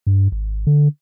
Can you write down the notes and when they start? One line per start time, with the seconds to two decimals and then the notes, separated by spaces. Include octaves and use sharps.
0.07 G2
0.32 G#1
0.67 D3